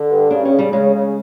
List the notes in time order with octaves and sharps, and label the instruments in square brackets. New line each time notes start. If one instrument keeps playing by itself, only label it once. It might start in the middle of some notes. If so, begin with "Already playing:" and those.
Already playing: [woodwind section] D3
G2
[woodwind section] C#3 [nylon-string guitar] D4
[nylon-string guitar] C#4
[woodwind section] C#3
[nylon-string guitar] G3
[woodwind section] C#3 [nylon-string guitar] G#3
[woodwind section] C#3